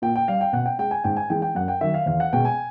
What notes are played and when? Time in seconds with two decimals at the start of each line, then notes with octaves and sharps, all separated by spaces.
0.02 A#2 G5
0.16 G5
0.28 G3 F5
0.41 G5
0.53 B2 F#5
0.66 G5
0.79 G#3 G5
0.91 G#5
1.04 G#2 G5
1.17 G#5
1.30 E3 G#3 G5
1.42 G5
1.55 F#2 F#5
1.68 G5
1.81 D#3 F#3 E5
1.94 F5
2.06 E2 F5
2.20 F#5
2.33 B2 G#3 G5
2.45 G#5